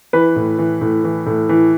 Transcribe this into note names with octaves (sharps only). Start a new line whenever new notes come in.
E3 B4
A2
E3
A2
E3
A2
E3